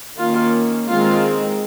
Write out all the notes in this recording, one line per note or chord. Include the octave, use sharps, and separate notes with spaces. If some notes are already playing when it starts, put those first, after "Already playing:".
D#3 A#3 C#4 F4
D#3 G#3 C4 F4